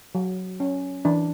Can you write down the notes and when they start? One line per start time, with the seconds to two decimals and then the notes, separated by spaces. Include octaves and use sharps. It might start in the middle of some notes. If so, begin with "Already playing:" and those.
0.15 F#3
0.60 C#4
1.05 E3 D4